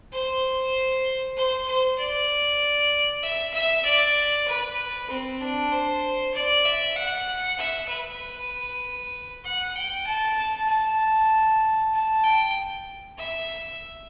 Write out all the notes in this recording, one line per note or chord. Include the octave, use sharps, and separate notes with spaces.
C5
C5
C5
D5
E5
E5
D5
B4
C4
D4
C5
D5
E5
F#5
E5
B4
F#5
G5
A5
A5
A5
G5
E5